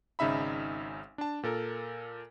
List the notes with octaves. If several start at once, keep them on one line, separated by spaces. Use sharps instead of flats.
G#1 C#3 D#4 E5 B5
D4 A5
A#2 A4 A#4